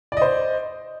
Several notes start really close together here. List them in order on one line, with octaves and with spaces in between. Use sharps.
D5 D#5 C5